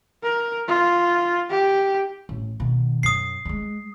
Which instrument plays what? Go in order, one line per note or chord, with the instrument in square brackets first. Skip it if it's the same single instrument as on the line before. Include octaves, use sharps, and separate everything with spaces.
[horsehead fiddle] A#4
F4
G4
[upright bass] A1
B2 D#3
[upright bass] F#2 [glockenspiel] D#6 C7
[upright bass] G3 G#3